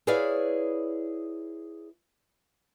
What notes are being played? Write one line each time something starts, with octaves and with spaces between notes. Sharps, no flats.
E4 G#4 B4 C#5 D5 F5